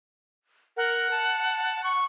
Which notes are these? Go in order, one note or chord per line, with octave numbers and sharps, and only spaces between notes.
A#4 F#5
A5
C#6